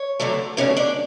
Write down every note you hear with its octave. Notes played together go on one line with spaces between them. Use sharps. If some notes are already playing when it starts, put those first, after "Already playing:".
Already playing: C#5
D2 D3 F#3 A3
D2 D3 F#3 A3 C#4 C#5
D4 D5